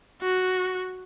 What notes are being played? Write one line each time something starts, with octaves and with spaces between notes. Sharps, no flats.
F#4